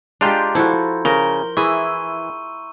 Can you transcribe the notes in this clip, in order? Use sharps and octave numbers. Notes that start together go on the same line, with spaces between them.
G#3 D4 F4 G4 G5 A#5 C6 G6
F3 E4 F#4 A4
C#3 A#4 G7
E3 E4 G#4 C#6 E6 D#7